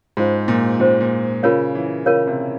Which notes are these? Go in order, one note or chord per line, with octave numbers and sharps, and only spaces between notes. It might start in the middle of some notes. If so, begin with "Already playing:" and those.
G#2 C#4 F4 C5 F5
A#2
A#2 C#4 F4 C5 F5
A#2
C#3 F4 A#4 C#5 F5
E3
C#3 F4 A#4 C#5 F5
C3